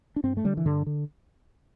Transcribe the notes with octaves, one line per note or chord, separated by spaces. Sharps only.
D4
G2 C4
A3
D3 G3
E3
G2 D3
D3